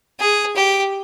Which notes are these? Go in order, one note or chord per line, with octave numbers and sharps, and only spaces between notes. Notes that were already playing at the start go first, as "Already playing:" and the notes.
G#4
G4